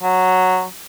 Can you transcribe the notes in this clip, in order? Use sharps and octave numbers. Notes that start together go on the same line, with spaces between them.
F#3